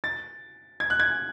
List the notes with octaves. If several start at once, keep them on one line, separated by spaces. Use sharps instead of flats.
A6
G#6
F#6
G#6